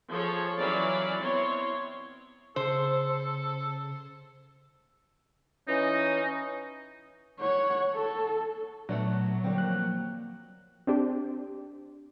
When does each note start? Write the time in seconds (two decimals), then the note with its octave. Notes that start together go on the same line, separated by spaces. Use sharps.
0.11 F3 G#4 A4 C#5
0.59 E3 F#3 C#4 D5 F5 B5
1.21 B3 C4 E4 C#5 C6
2.56 C#3 A4 C5
5.69 E3 C#4 D#4
7.40 C#5 F#5
7.94 A4
8.89 A#2 F#3 A3 B3 D4
9.44 D3 G3 A#3 C4
9.58 F3 A#3 F#6
10.87 C4 D4 G4